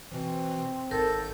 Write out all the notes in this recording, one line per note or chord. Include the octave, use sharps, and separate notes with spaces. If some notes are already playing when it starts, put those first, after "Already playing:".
B2 E3 C4
G#1 G#2 A4 A#4 G6